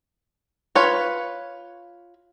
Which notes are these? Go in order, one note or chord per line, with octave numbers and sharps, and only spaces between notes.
F4 B4 C#5